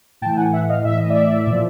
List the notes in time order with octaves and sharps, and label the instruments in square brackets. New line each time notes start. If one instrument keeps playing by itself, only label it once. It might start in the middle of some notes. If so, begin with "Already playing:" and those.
[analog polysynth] A2 G5 A5
E3
F#5 G#5
E5 F#5
D#5 F5
A2 E3 E5
D#5
D5 E5
A#2 F3